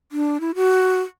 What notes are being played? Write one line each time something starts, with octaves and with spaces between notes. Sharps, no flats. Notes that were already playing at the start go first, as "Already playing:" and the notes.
D4
E4
F#4